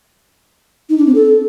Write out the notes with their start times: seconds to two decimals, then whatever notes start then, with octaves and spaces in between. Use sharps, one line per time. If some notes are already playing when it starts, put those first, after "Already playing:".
0.89 D#4
0.98 D4
1.06 C4
1.15 A4